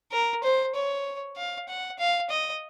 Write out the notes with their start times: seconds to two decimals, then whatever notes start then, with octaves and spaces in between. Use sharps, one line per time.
0.12 A#4
0.43 C5
0.75 C#5
1.36 F5
1.69 F#5
1.99 F5
2.30 D#5